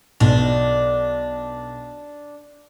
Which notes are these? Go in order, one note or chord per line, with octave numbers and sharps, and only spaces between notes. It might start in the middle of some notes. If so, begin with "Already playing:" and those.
B1 D4